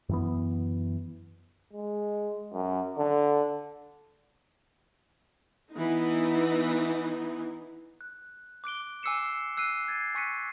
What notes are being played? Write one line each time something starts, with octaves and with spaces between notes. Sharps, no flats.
F#2 E3 B3
G#3
F#2
D3
E3 B3 D#4
F#6
D6 F#6 D7 G7
G#5 D6 E6 C7 C#7 E7
E6 F#6 C7 D#7
G#6 A6 C7 D#7
G#5 C#6 F#6 B6 C#7 D#7